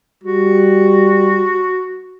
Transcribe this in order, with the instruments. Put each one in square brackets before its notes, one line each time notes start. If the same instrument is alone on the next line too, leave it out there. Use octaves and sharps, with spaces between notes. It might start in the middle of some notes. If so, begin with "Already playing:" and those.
[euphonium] G3 [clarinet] F#4